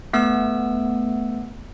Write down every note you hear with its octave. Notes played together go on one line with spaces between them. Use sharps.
A3 B3 E6